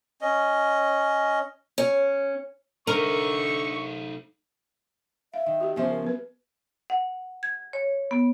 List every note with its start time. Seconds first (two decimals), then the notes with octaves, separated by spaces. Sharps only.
0.21 C#4 D#5
1.78 C#4
2.87 D3 A3 D#4 A#4 C#6
5.34 E5 F5
5.46 D#3
5.60 F#4 G4
5.76 C#3 F3 B3 G4 C5 E5
5.89 A#4
6.03 B3 B4
6.90 F#5
7.43 G#6
7.73 C#5
8.11 B3